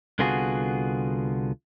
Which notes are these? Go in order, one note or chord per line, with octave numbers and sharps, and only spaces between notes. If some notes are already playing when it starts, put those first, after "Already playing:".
C2 D3 B3 F4 F#4 G#4